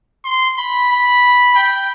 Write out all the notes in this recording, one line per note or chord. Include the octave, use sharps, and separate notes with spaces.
C6
B5
B5
G5